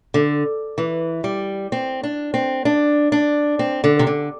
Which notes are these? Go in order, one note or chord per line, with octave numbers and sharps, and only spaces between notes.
D3
E3
G3
C4
D4
C4
D4
D4
C4
D3
C3
D3